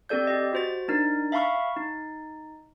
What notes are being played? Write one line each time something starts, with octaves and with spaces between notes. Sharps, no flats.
C4 G4 A4 D5 G6
G4 D#5
F#4 C5 A6
D4 D#4 A#4
E5 F5 A5 B5 C#6 F6
D#4